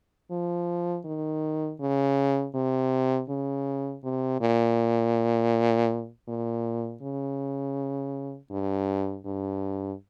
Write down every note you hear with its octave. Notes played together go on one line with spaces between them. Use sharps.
F3
D#3
C#3
C3
C#3
C3
A#2
A#2
C#3
G2
G2